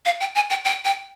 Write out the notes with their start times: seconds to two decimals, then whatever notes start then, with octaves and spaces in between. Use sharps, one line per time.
0.06 F5
0.21 G5
0.35 G#5
0.50 G5
0.65 G5
0.85 G5